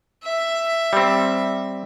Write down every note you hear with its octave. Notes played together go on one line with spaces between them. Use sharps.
E5
G3 C4